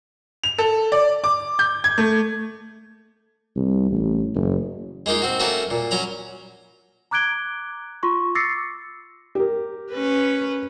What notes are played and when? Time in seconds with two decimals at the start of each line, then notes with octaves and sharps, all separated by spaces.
0.43 F7
0.58 A4
0.92 D5
1.24 D6
1.59 G6
1.84 G#6
1.98 A3
3.56 C2
3.90 A1
4.35 F#1
5.06 G#3 A#3 D#4 F4
5.22 C4 F#4
5.40 A3 A#3 C#4 F#4 A4 A#4
5.70 A#2
5.91 F#3 C#4 A#5 B5
7.11 A#5 D6 F#6 G#6 D7 G7
8.03 F4 C6 C#6
8.35 D6 E6 A6 A#6 C7 C#7
9.35 G4 A#4
9.92 C#4 B4